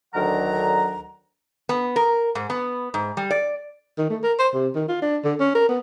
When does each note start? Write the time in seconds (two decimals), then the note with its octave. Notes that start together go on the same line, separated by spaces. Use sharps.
0.14 D2 D3 D#3 F#3 F#5 A#5
1.69 B3
1.96 A#4
2.35 G#2
2.50 B3
2.94 G#2
3.17 G3
3.31 D5
3.98 D#3
4.10 A3
4.23 A#4
4.38 C5
4.54 C3
4.75 D#3
4.88 F4
5.02 D4
5.24 D3
5.40 C#4
5.55 A#4
5.69 B3